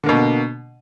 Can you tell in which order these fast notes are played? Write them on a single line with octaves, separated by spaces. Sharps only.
D3 A#3 B2